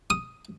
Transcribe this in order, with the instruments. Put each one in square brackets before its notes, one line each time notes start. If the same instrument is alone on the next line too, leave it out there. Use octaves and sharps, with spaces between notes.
[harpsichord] D#6